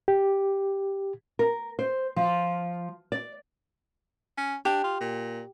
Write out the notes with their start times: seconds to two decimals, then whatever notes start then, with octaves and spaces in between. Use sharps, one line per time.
0.08 G4
1.39 A#4
1.79 C5
2.16 F3
3.12 D5
4.37 C#4
4.65 D4 G4
4.83 F4
5.00 A#2